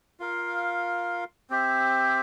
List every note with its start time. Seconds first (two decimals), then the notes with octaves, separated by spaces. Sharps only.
0.20 F4 A#4 F5
1.50 C4 G4 C5 E5